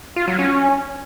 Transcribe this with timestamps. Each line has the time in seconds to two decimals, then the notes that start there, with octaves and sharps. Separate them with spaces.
0.16 F4
0.28 F#3
0.39 C#4